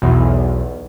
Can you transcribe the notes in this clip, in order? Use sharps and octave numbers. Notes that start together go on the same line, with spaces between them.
B1 E2